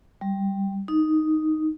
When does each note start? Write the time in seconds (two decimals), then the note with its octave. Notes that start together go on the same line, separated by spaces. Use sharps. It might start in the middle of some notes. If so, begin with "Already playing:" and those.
0.21 G3
0.88 D#4